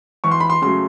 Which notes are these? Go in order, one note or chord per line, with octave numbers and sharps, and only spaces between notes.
E2 C#6
C6
B5
C6
C#3 F#3 A3 C6